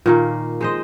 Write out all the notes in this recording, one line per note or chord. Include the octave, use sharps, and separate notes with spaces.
A#2 D#3 A#3
G#3 C5 D#5